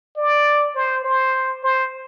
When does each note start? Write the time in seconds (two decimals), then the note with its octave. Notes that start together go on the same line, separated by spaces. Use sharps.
0.17 D5
0.75 C5
1.04 C5
1.63 C5